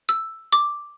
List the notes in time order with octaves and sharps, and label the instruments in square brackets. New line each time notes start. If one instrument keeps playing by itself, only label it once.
[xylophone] E6
D6